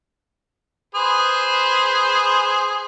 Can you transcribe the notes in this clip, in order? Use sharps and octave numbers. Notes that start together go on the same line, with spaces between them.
G#4 B4 C5